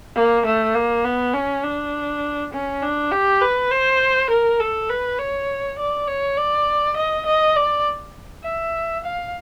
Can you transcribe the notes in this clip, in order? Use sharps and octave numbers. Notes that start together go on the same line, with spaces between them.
A#3
A3
A#3
B3
C#4
D4
C#4
D4
G4
B4
C5
A#4
A4
B4
C#5
D5
C#5
D5
D#5
D#5
D5
E5
F5